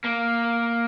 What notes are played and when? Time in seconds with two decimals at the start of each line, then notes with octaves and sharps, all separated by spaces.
0.04 A#3